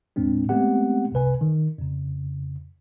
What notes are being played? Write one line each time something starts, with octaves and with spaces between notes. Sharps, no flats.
D#2 A2 G#3 C4 D4
G#3 A3 B3 C4 G4 F#5
C2 F#2 C3 B4 G#5
D#3
F2 C#3